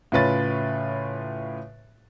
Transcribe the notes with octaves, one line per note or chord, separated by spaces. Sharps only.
A2 C#3 F4 B4 C#5 A6